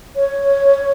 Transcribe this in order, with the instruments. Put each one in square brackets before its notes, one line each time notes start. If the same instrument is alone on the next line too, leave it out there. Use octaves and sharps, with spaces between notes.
[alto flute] C#5